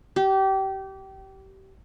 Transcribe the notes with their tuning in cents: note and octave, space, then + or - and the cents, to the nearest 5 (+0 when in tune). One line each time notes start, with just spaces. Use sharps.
G4 -25